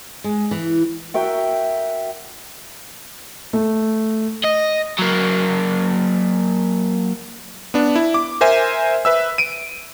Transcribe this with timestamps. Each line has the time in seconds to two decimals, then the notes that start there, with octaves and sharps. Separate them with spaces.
0.24 G#3
0.51 E3
1.14 F#4 A#4 E5 G5
3.53 A3
4.44 D#5
4.98 F#3 A#3
7.74 B3 D4
7.96 E4
8.14 D6
8.41 A#4 C5 E5 G#5
9.05 B4 E5 E6
9.38 D7 D#7